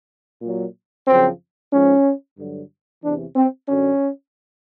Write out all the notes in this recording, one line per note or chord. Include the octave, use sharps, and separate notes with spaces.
A#2 F#3
F#2 C#3 F3 C4
G#2 F3 C#4
G2 D3 F#3
E2 C3 E3 D4
C4
F#2 D3 F#3 C#4